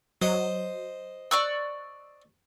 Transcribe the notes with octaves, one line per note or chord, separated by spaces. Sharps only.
F#3 C5 D#5
D5 C#6 E6 F#6